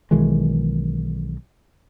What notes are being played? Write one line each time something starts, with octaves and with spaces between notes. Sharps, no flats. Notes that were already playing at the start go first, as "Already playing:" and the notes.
B1 D#3 E3 G#3